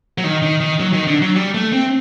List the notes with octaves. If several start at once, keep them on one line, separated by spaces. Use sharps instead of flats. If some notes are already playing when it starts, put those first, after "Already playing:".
F#3
D#3
D#3
D#3
F#3
D#3
D3
F#3
G3
A3
C4